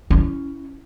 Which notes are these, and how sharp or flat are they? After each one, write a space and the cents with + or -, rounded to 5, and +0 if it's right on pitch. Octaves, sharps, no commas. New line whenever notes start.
C#4 +10 E4 +0